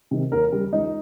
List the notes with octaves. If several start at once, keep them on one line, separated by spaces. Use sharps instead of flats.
C3 D#3
D#2 A#4
C#3 G3
C#2 D#4